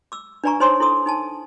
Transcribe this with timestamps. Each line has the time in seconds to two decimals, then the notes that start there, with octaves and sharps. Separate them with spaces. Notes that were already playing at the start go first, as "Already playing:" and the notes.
0.12 D6 E6
0.44 D4 B4 D5 G#5 A#5 C#6
0.60 D#4 C5 C#5 G#5 C6 D#6
0.80 E4 A4 C6 D#6
1.06 D#4 G#5 A5